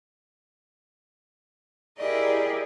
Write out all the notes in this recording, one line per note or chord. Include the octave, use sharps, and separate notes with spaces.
E4 G4 G#4 A#4 D5 D#5